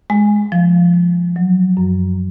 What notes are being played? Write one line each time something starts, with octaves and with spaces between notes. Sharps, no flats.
G#3
F3
F3
F#3
F#2